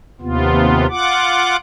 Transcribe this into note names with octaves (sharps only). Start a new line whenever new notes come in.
D#2 C3 B3 F4
F4 F#5 D6